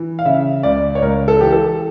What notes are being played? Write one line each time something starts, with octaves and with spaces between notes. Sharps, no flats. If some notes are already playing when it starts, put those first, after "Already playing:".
Already playing: E3
F5
C#3 E5
C#2 D5
C#5
C#2 A#4
A4
E3 G4
A4